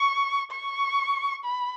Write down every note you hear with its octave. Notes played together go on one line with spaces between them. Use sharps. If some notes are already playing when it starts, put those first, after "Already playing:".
Already playing: C#6
C#6
B5